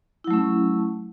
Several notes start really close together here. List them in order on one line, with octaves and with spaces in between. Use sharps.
E4 F#3 A3 C#4